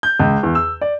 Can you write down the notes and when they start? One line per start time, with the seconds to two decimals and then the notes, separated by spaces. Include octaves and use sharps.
0.03 G6
0.20 C#2
0.43 E2
0.55 E6
0.81 D5